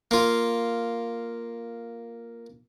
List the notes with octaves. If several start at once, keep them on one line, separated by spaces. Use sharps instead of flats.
A#3 F4